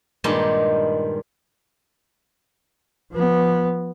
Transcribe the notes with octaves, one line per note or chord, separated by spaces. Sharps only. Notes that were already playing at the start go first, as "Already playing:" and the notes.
G2 A#2 D#3 G3 G#3
F3 B3